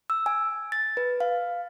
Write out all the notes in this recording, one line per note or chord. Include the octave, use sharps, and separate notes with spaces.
E6
G#5
A6
B4
F5